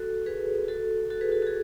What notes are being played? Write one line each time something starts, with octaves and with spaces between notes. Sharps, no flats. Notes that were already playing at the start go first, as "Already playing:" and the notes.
Already playing: F#4 A4
G#4 B4
F#4 A4
F#4 A4
G#4 B4
F#4 A4
F#4 A4
G#4